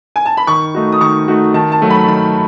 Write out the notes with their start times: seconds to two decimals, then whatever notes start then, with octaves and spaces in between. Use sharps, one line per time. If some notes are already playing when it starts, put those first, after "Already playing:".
0.16 G#5
0.26 A5
0.37 B5
0.47 D#3 C#6
0.75 A3 D#4 F#4
0.92 D#6
1.01 D#3 C#6
1.28 A3 D#4 F#4
1.54 D#3 A5
1.72 A5
1.82 F#3 A3
1.90 B5
2.08 D#3 B5